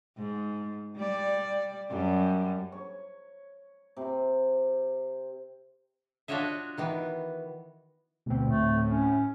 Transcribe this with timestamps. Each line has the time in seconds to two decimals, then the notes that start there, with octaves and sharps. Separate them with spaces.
0.17 G#2
0.95 G3 D5
1.89 F#2 G3
2.72 C#5
3.97 C3
6.28 D4 F4 F#4 C#5 D#5 E5
6.77 D#3 E3 B3
8.26 D2 B2 C4
8.48 A2 A3
8.89 C#4